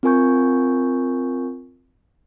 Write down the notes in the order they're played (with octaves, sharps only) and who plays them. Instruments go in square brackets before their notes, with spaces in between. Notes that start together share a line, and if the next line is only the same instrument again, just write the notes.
[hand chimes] C4 F4 A#4 G#5 C#6 G6